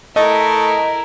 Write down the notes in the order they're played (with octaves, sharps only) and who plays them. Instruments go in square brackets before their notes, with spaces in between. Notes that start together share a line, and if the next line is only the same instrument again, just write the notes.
[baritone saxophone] A3 [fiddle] E4 A#4 [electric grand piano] D#5